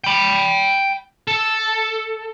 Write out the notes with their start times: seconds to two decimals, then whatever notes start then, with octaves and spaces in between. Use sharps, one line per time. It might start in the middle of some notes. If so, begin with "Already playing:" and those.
0.04 G5 B5
1.28 A4